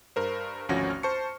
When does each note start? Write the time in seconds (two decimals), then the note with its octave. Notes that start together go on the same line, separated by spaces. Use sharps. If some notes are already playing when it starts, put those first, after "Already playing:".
0.16 G2 A#4 C5
0.69 G#1 D2 F3 C#4 F#4 A#6
0.90 F6
1.03 C5 A5 C#6 C#7